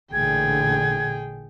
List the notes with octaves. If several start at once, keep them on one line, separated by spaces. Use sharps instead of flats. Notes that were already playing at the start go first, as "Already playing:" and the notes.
A1 A#2 D3 G#4 G5 G#6